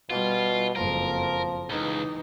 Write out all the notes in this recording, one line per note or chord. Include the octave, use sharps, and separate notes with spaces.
B2 G3 F4
F#1 F2 F3 A#4
C#2 E3 D#4